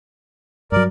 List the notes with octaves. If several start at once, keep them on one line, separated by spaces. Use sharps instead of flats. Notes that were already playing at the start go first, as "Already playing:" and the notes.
G2 F#3 A#4 D5